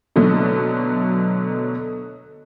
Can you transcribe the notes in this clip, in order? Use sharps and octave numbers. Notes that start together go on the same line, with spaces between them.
B2 D3 F#3 A3